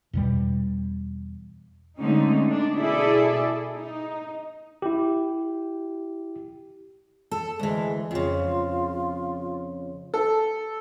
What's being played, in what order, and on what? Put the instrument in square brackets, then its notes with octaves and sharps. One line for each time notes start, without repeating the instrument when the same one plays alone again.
[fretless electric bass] E2 B2 G3
[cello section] D3 G#3 A3 C4 C#4 D#4
D4
B2 E4 G#4 A4 D5
D#4
[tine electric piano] E4 G4
[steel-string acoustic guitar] A4
[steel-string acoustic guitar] D2 E3 [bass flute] G#3
[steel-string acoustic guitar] F2 C#3 [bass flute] F4
[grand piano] A4